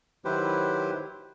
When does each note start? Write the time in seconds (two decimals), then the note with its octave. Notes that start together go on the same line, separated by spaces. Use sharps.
0.25 D#3 F#3 E4 G4 B4 C5